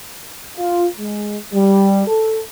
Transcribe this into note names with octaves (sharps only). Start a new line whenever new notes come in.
F4
G#3
G3
A4